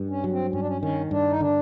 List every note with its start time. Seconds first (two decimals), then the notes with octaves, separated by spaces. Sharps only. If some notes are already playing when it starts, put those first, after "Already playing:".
Already playing: G2
0.09 C#4
0.24 F#3
0.31 C4
0.53 G2 C#4
0.60 D4
0.67 C#4
0.82 D#3 C#4
1.11 G2 D4
1.30 D#4
1.41 D3 D4